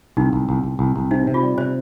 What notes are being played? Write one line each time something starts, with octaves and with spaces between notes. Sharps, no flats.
C2 D#4
C2
C2
C2
C2
C2
C3 D#4
C3
F4
G3
C3 C5